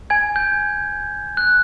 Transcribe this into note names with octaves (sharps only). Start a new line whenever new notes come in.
G#5 G#6
G6
F#6